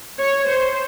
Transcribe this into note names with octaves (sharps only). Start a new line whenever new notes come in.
C#5
C5